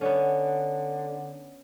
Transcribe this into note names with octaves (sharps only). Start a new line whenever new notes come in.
D3 B3 C#4